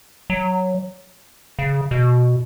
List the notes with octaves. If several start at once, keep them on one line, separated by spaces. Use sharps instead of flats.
F#3
C#3
B2